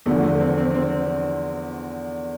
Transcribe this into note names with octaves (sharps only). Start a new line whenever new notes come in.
E2 D3 F3 A3
A3
C4
C4
C4